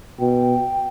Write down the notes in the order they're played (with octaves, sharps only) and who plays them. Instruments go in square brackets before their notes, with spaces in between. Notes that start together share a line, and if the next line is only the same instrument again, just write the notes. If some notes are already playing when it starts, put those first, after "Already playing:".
[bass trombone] B2 [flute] G5